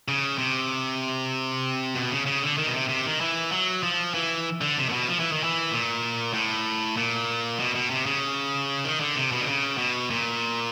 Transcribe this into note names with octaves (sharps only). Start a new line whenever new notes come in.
C#3
C3
B2
C#3
C#3
D3
D#3
B2
C3
C3
D#3
E3
F#3
F3
E3
D3
C3
A#2
B2
F3
E3
D#3
E3
A#2
A2
A#2
B2
B2
C3
C#3
D#3
D3
C3
B2
D3
C#3
B2
A#2